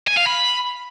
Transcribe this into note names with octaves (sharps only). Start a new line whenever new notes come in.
G#5
F5
B5